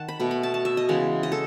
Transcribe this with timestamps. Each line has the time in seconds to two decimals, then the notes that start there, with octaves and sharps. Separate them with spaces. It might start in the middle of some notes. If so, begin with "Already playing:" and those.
Already playing: D#3 F#5 A5
0.08 B5
0.19 B2 A3 B5
0.31 B5
0.43 A5
0.54 A5
0.65 E5
0.77 D#5
0.89 C#3 E3 G#3 B3
1.23 D#5
1.32 A4